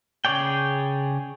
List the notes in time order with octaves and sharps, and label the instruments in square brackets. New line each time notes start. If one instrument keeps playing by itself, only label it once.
[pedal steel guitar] C#3 G#4 C#5 D5 G5